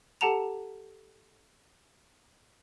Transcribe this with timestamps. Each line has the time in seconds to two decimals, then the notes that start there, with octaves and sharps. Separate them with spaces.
0.21 G4 A4 F#5 A5 A#5 F7